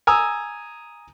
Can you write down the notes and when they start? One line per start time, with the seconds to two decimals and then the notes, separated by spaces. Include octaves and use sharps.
0.07 G#5 A#5 D#6 E6